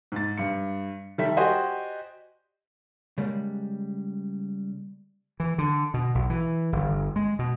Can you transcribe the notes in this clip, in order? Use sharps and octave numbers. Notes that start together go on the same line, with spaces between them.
G#2 A6
G2 C#7
D#3 G3 A4 E5 B6
F#4 G4 C5 D5 D#5 G#5
C#3 G3 G#3 A#3
E3
D3
B2
B1
E3
G1
G#3
B2